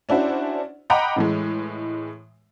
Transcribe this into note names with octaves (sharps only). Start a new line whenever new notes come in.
C#4 D4 E4 F#4 C5
D#5 F#5 G5 A#5 B5 D6
A2 E3 G#3